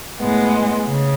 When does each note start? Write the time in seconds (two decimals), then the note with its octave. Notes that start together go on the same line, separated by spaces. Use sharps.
0.19 A2 G#3 B3
0.86 C#3